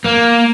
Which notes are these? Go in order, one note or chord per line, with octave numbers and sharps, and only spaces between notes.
A#3